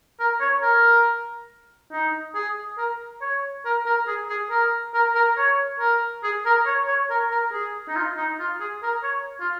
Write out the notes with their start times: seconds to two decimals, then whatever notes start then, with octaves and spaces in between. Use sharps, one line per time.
0.20 A#4
0.41 C#5
0.63 A#4
1.92 D#4
2.35 G#4
2.78 A#4
3.21 C#5
3.65 A#4
3.86 A#4
4.08 G#4
4.29 G#4
4.50 A#4
4.94 A#4
5.15 A#4
5.38 C#5
5.80 A#4
6.23 G#4
6.46 A#4
6.66 C#5
6.87 C#5
7.10 A#4
7.31 A#4
7.52 G#4
7.88 D#4
7.96 F4
8.17 D#4
8.39 F4
8.60 G#4
8.83 A#4
9.03 C#5
9.40 F4